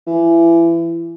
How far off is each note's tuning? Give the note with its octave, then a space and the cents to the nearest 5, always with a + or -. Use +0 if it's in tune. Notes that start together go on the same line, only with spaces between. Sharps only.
E3 +25